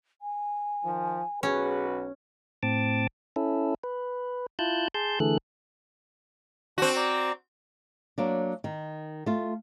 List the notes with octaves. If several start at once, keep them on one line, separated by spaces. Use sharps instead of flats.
G#5
D#3 F3
B1 C#4 F#4 G#4 B4
A2 C4 A5 D6
C#4 E4 A4
B4
E4 F4 A5 F#6 G6
G#4 A5 C6 G6
D3 E3 A3 G#4 A4 F#6
C4 D4 F#4
D5 A#5
F#3 A#3 D4
D#3
A3 F4